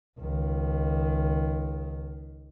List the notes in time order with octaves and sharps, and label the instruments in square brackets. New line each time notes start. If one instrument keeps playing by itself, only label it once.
[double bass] C#2 D#3